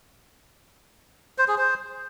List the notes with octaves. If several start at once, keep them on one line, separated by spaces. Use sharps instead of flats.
C5
G#4
C5